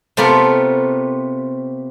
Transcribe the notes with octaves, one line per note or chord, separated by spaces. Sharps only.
C3 A3 B3 F4 A#4